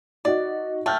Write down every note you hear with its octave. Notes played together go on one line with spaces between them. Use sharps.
D#4 F#4 D5 D#5
A3 G5 F6 G6